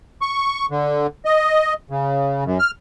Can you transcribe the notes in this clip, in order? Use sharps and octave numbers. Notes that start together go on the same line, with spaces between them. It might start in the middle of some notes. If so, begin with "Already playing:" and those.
C#6
D3
D#5
C#3
F#2
F6